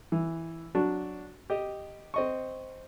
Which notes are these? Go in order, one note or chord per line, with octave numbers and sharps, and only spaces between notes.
E3
F#3 D4 F#4
G4 D#5
C4 D#5 C#6